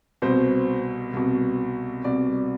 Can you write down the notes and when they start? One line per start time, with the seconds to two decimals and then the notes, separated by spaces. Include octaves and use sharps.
0.22 C2 B2 C5
1.13 C2 B2
2.04 C2 B2 D5